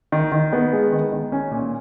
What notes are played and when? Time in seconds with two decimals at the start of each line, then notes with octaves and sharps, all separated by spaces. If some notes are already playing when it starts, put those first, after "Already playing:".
0.12 D#3
0.32 D#3
0.53 B3
0.72 G#3
0.92 D#3
1.12 D#3
1.32 C#4
1.52 A#2